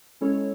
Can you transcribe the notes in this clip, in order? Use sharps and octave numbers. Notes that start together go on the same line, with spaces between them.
G#3 C#4 E4 A4 C#5